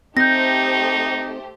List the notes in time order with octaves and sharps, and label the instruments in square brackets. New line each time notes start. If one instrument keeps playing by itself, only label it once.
[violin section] A3 G4 C5 [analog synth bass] C4 [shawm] D#4 [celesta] G6 A#6